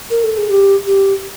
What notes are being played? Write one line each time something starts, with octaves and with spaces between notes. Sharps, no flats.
A#4
A4
G#4
G4
G4